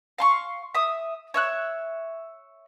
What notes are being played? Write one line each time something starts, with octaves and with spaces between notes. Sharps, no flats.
F5 C6 C#6
E5 D#6
C#5 E5 F#6